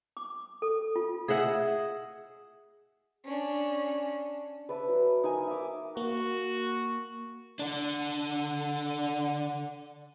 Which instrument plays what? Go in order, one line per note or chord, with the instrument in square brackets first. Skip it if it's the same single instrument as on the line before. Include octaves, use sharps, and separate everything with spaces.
[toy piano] D6
A4
F4
[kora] G#4 D#5 E5 F#5
[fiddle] C#4 D4
[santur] B4 D5 E5 A5
F#3
D#4 A#4 G#5
E5 D6
[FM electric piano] A#3 [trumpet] F#4
[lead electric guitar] D3 D4